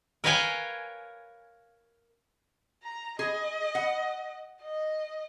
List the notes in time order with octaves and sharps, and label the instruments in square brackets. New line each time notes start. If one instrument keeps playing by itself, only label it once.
[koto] A#4 B4 C#5 F5 G5 G#5
[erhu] A#5
[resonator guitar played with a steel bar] G#4 [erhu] D#5
[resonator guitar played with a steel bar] F#5
[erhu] D#5